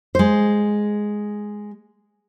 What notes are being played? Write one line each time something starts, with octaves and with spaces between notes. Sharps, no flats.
G#3 C5